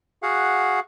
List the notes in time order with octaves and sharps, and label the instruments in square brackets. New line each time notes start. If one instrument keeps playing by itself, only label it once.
[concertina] F#4 G#4 F5 F#5